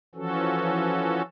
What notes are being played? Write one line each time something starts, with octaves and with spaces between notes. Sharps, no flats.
E3 F3 C#4 F#4 A4